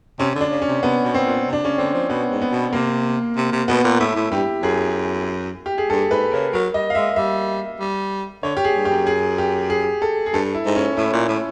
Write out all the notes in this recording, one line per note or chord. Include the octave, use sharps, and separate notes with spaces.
C3 C#4
D3
D4
C#3
C#4
C3
C3 B3
B2
C4
A#2
C3
D4
C#3 C#4
D3 C4
F3
B2 B3
G#2
B3
B2
C3 A#3
C3
C3
B2 B3
A#2
A2 E4
A2
G2 G4
F#2 G#4
G4
G#4
G2 A4
G#2 B4
C#3 A#4
F#3 A#4
G3 D#5
F5
G#3 E5
G3 E5
G3
D3 C#5
G4
G#4
G2
G4
F#2
G#4
G4
G#4
A4
G#4
G2 A4
E4
G#2
C#4
A2 E4
A#2
A2